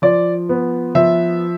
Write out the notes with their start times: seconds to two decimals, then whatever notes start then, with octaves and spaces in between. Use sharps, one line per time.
0.02 F3 D5
0.49 B3
0.95 F3 E5